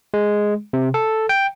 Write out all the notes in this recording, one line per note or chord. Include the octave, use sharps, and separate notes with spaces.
G#3
C3
A4
G5